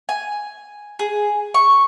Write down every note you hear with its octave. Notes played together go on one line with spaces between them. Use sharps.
G#5
G#4
C#6